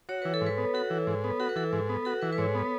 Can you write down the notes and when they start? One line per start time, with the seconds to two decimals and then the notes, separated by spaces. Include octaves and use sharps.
0.09 F#4 C#5
0.22 E3 B4
0.34 A4
0.41 G#2
0.46 B4
0.58 B3
0.74 F#4 A4
0.90 E3
1.07 G#2
1.24 B3
1.40 F#4 A4
1.49 B4
1.56 E3 A4
1.73 G#2
1.89 B3
2.05 F#4 A4
2.22 E3 B4
2.33 B4
2.38 G#2 C#5
2.55 B3